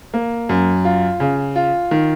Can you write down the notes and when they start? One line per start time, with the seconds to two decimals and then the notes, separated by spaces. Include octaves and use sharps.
0.14 A#3
0.49 F#2
0.85 F4
1.20 C#3
1.56 F4
1.91 D#3